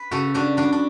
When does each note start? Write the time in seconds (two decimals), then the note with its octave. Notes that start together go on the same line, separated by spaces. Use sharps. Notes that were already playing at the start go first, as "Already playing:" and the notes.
Already playing: B4
0.11 C#3 F#4 A4
0.34 C#3 D4 F#4
0.57 G3 D4 F#4
0.72 D4